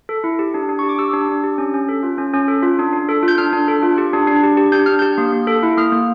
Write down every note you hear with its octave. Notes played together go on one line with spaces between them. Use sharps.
A4
E4
G4
D4
D4
G4 C#6
D6
G4 E6
D4
D4
G4
C#4
C#4
A4
F4
C#4
C#4
A4
F4
D4
D4
A4
F4
G6
D4 F6
D4
A4
F4
G4
D4
D4
G4
G4
D4 G6
D4 F6
G4 G6
A#3
A#3
A4
E4
A#3 F6
A#3